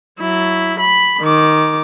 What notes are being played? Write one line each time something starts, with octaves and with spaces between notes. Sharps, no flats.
F#3 E4
B5
D#3 D6